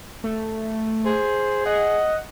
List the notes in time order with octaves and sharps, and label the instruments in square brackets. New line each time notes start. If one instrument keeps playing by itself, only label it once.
[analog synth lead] A3
[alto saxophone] G#4 [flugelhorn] C5
[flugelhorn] D#5 [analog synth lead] F#5